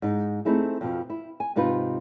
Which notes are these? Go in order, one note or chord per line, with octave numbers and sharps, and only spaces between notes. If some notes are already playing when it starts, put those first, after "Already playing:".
G#2 D#4
A3 C4 D#4 E4 G#4
F2 B2 F3
E4
G#5
G#2 C3 D#4 F4 B4